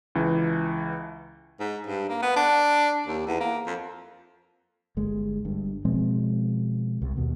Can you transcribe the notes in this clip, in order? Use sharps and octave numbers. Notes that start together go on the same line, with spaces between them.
C#2 E3
G#2
G2
A#3
B3
D4
D#2
E2
A#3
F2
G1 G#3
G1 G2
B2 F3 G#3 C4
C2
D#2 B2